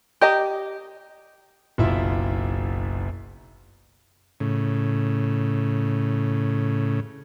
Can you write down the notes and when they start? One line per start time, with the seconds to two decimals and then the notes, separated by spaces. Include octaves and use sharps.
0.21 G4 D#5 A#5
1.78 F#1 B1 E4 F4 E5
4.40 A2 C#3